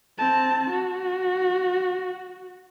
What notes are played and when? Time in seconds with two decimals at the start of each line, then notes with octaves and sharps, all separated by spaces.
0.18 C4 A5
0.70 F#4